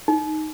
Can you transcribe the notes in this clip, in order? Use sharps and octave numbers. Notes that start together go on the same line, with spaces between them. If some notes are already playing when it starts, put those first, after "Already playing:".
D#4